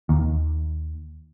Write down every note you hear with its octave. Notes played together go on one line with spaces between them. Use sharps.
D#2